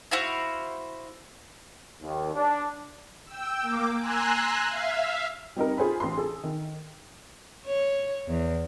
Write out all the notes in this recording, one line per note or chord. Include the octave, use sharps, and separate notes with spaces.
E4 F#4 C5 F5
D#2
D4
G5 E6
A#3 D6
G#5 A#5 C6 E6 F#6
E5 F5
G3 C4 D#4 A#4
F4 G#4 C5 G#5 B5
A1 G4 C6
G#4 A4
D#3
C#5
E2